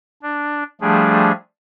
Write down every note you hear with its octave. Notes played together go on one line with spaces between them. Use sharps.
D4
F3 G3 A3 D4 G#4